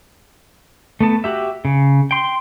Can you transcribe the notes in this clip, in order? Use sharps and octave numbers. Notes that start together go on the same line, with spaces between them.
A3 B3 A5
F#4 G4 E5
C#3
G5 C6